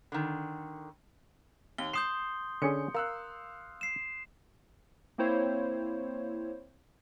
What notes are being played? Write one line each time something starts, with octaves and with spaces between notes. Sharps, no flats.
D3 D#3
D#2 G7
C6 D#6 G6 C7 E7
D3 C#4 G#4 C#7
A#4 F5 E6 F#6
C7 E7
A#3 C4 E4 C5 C#5